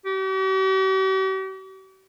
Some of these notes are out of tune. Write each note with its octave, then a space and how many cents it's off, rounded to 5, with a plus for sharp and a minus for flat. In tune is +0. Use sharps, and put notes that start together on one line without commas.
G4 -45